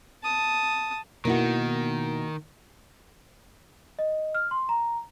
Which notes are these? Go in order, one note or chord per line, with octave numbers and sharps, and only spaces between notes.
A5 D#6
B2 D#3 A#3 B3 D#4 E4 F#4
D#5
F6
C6
A#5